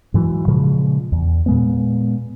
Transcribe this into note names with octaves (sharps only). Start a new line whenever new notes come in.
G#2 E3 F#3
A#2 C#3 F3 G#3
E2
A#2 G#3 B3